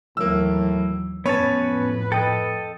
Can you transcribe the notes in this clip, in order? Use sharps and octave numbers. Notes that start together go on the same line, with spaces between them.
D#2 A2 E3 F#3 A#3 E6
F2 A2 B3 C#4 B4 C#5 A5
A4 D#5 G5